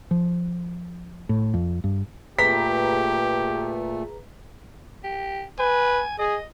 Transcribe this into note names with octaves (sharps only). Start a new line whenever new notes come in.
F3
A2
F2
G2
A#2 A3 G4 G#4 B4 A#5 B6
G4
B4 G#5
G#4 D#5